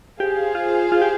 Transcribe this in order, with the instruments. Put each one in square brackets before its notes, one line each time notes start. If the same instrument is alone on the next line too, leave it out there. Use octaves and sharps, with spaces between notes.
[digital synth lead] G4 [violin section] G#4 C5 F5
[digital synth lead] F4
F4
G4